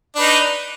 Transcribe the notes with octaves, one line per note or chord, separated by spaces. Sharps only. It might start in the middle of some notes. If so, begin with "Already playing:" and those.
D4 D#4 B4